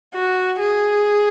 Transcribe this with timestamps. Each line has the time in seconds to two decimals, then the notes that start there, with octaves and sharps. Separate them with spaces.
0.15 F#4
0.59 G#4